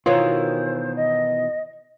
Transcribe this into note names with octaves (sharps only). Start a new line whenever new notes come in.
B2 D#3 E3 F4 C5 C#5
D#5